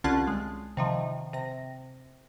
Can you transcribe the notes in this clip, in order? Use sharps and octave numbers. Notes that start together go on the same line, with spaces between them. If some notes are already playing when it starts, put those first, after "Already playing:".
C2 D3 C#4 F4 A5 F#6
G#3
C3 D#3 F3
C3 A#6